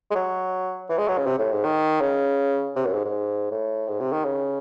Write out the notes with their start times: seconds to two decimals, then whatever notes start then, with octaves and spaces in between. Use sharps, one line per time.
0.11 G#3
0.15 F#3
0.89 E3
0.98 G#3
1.08 F#3
1.18 C#3
1.26 C3
1.38 A2
1.51 G#2
1.64 D#3
2.01 C#3
2.76 C3
2.85 F#2
2.94 G#2
3.04 G#2
3.51 A2
3.88 G#2
4.00 C3
4.12 D#3
4.25 C#3